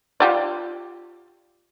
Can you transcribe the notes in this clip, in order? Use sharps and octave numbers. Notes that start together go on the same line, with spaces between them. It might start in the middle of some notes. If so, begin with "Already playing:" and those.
F4 G4 D5